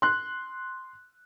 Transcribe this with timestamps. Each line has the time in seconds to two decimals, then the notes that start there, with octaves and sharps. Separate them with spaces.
0.02 C6 F#6